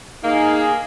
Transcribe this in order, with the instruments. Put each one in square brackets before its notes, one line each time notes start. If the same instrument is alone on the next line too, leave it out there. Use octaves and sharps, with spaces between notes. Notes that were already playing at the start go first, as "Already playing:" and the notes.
[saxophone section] A#3 [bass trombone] D#4 [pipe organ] G#4